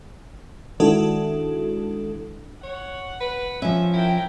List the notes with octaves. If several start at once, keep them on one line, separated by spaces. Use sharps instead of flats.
D#3 G#3 D4 E4 F#4 A4
C#5 F#5
B4
F3 C#4 E5
E4 A#4 G5